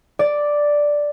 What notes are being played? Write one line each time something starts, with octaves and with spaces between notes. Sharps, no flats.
D5